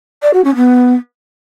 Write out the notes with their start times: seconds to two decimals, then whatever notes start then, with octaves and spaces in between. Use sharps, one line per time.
0.22 D5
0.33 F#4
0.44 C#4
0.55 B3